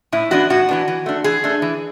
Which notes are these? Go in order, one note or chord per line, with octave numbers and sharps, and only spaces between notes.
A2 E4
E3 B3 D4 F#4
A2 F#4
E3 B3 D4
E3
A3 D4
E3 G#4
A3 D4
E3